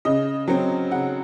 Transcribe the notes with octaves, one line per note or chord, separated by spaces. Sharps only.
C#3 D#5
F#3 C4
C#3 F#5